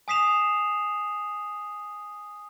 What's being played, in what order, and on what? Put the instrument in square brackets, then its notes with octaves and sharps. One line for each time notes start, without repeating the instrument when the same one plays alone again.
[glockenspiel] G#5 D#6 B6 C7 E7 F7